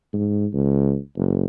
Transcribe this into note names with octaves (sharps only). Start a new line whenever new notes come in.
G#2
C#2
F#1